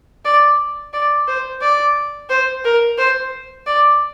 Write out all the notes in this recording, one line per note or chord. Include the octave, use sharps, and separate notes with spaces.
D5
D5
C5
D5
C5
A#4
C5
D5